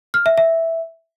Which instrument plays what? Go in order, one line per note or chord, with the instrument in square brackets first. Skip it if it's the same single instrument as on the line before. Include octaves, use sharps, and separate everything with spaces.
[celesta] F6
E5
E5